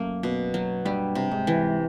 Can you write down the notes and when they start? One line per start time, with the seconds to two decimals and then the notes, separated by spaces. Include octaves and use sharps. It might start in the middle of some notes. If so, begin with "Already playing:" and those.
Already playing: F#2 A3 A#3
0.23 B2
0.54 F#3
0.85 G2 G3
1.15 C3
1.31 G#2
1.47 E3